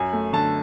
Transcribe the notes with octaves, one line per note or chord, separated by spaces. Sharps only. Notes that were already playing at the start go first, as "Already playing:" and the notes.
Already playing: F#2 G#5
A3
D3 A5